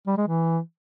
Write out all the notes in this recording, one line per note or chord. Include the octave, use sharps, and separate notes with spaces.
G3
G#3
E3